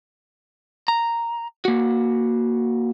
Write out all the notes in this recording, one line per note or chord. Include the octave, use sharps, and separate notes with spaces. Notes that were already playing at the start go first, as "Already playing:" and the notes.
A#5
A#3 F#4